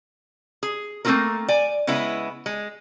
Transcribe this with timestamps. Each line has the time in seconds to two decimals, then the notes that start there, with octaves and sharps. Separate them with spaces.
0.63 G#4
1.05 A3 A#3 C4 F4 F#4 A#4
1.48 D5 G#5
1.87 C#3 G#3 B3 E4
2.46 G#3